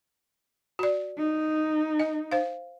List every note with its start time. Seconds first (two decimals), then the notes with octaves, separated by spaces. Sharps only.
0.79 F#4 D5
1.18 D#4
1.99 D#5
2.32 C5 F5